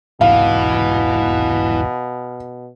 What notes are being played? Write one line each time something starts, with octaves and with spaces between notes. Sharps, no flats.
E1 C2 G#2 B2 E3 F5